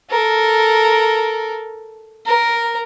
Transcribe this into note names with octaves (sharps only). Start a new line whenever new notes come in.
A4 A#4
A#4